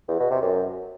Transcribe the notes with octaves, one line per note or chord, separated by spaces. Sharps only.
E2
B2
C3
F#2